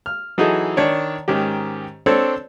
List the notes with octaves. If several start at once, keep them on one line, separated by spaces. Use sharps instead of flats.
F6
E3 F#3 D#4 G#4 A4
D#3 D4 C#5 D5
G#2 D#3 C#4 G4
C4 D4 A4 C5 C#5